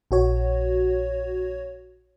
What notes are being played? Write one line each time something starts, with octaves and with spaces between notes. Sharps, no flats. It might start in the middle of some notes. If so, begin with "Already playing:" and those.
A#1 F#4 C#5